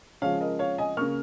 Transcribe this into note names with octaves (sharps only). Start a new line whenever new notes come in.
C#3 F3 G#3 C#5 F5
A#4 D#5
C#5 F5
D#5 G#5
C#3 A#3 C#6 F6